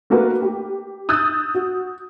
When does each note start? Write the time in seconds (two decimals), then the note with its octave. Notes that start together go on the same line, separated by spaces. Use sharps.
0.10 A3 A#3 F#4 A#4 B4
0.42 G4
1.09 D#6 E6 F#6 G6 A6
1.55 F#4